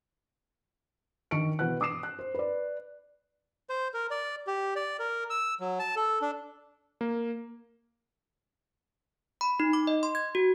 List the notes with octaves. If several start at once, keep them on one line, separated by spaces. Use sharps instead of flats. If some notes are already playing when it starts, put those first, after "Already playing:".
D#3 D4 C#6 C#7 D7
B2 E3 B4 F#5 F#6
D6 D#6 C7 E7
F#6
C5
B4 D5
C5
A#4
D5
G4
D5
A#4
E6
F#3
A5
A4
D4
A#3
B5
D#4
D6
D#5
C6
G#6
F#4